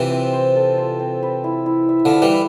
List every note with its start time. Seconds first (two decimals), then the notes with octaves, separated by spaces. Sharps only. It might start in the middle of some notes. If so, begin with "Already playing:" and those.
Already playing: C3 E3 F4
0.10 C4
0.33 C5
0.56 A4
0.78 F4
1.00 C4
1.23 B4
1.44 E4
1.66 E4
1.89 E5
2.05 D3 F3
2.11 B4
2.22 E3 G3
2.33 E4